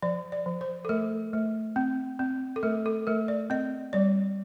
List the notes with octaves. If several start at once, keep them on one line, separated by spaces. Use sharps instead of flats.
F3 D5
D5
F3
C5
A4
A3 A#4
A3
C4
C4
A4
A3 A#4
A4
A3 A#4
D5
C4 D#5
G3 D5